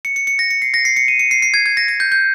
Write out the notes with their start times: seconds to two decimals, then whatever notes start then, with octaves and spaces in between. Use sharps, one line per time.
0.05 C#7
0.16 C#7
0.27 C#7
0.39 A#6
0.50 C#7
0.62 C7
0.74 A#6
0.85 C7
0.96 C#7
1.08 D#7
1.19 C#7
1.31 C7
1.42 C7
1.54 G#6
1.66 G#6
1.77 A#6
1.88 A#6
2.00 G6
2.12 G6